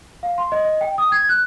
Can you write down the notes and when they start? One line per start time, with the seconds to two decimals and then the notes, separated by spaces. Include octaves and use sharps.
0.23 F5
0.38 C6
0.52 D#5
0.65 D#5
0.81 G5
0.98 D#6
1.12 G#6
1.29 F#6